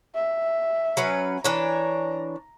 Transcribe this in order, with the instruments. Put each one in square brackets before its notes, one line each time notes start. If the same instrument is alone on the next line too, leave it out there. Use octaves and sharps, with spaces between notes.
[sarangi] E5
[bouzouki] F#3 C#4 B4
[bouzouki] E3 D4 C#5 [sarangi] A#5